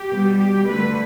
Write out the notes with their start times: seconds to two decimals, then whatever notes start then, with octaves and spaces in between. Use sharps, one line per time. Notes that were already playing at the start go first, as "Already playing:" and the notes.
Already playing: G4
0.10 B2 G3
0.39 G4
0.67 D3 A3 B4